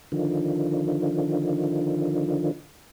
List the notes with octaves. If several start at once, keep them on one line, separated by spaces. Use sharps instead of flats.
D3 D#3 F3